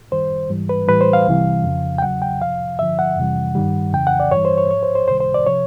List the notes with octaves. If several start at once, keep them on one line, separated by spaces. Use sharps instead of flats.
F#2 D#3 G3 C5
G#2 E3 G3
B4
A2 E3 G3 B4
C5
F5
C2 C3 E3 G3
F2 C#3 F3
G5
E2 C#3 F#3 F#5
G5
F2 C3 F3 F5
G2 D3 F3 E5
F#5
F2 C3 E3 G3
G2 D#3 G3
F2 C#3 E3 G5
F#5
D5
G2 E3 G3 C#5
C5
C#5
G#2 F3 C#5
C5
C5
C#2 C3 D#3 G3 C5
C5
D5
C3 F3 C#5